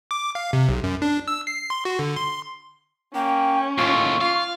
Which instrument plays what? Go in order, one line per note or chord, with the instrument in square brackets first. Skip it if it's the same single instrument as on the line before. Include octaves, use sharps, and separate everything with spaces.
[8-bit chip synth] D6
F5
C3
B1
F#2
D4
E6
C7
C6
F#4
D3
C6
[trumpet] A#3 [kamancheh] C#4 [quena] G5
[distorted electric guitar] D#2 A2 [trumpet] F4 [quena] C#6
[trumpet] F4 [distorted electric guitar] F5